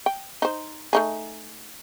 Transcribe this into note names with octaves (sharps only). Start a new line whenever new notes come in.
G5
D#4 C5
A3 D#4 G#4